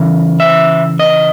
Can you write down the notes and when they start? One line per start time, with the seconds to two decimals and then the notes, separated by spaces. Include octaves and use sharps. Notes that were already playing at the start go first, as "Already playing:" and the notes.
Already playing: C#3 E3
0.40 E5
0.99 D#5